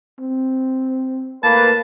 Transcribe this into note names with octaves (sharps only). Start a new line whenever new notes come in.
C4
A2 A#3 B4 A5